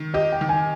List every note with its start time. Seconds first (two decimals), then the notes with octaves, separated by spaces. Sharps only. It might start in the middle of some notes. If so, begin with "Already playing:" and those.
Already playing: D#3
0.14 G4 D#5
0.32 G5
0.41 D#3
0.49 G#5